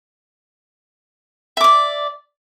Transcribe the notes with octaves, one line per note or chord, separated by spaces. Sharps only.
D5 E5 D6